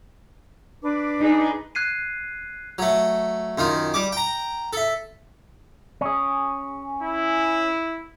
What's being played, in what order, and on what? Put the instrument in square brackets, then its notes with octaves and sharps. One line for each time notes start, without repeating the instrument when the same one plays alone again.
[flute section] D4 B4 D6
[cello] D#4 G#4
[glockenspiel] F#6 G#6 C7 D#7
[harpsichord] F#3 A3
F#2 D#3 F4
G3 D6
G5 A#5
A4 E5
[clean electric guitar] C#4 G#4
[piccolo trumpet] E4